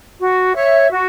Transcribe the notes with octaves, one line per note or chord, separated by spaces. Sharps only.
F#4
C#5 E5
F#4